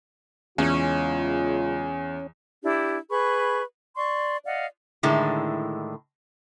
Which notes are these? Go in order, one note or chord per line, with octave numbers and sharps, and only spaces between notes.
E2 C#3 G#3 C#4 F4
D4 E4 G4
G#4 B4 B5 C#6
D5 C6 C#6
D5 D#5 F5 F#5
A2 D3 D#3 G#3 E4